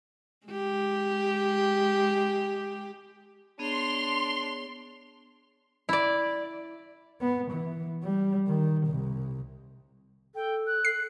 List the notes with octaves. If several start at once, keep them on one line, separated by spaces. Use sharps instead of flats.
G#3 G4
B3 D4 G#4 C#5 C6 F7
E4 D5
B3
E3
G3
D#3
C2
A4 G5
F#6
C7